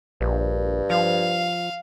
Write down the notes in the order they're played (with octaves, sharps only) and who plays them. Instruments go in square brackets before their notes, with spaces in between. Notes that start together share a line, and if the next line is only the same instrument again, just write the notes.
[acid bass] A#1 [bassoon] G2
[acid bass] F3 [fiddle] F5